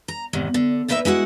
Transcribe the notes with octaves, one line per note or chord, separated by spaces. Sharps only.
A#5
E2 G#2 C3 D#3
D3
A#2 A#3 D#4 B4 D5 E5
G#3 E4 F#4 F#5